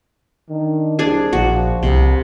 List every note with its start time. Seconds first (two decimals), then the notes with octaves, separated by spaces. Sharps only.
0.49 D#3 D4
0.99 C2 D4 G#4 G#5
1.33 A#1 F3 F#4
1.83 C2 C3